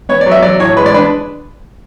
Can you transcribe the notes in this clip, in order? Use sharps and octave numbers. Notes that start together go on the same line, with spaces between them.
B3 C#5
D5
F#3
E5
F#3 D5
A2 C#5
G#3 B4
D5
D4 B4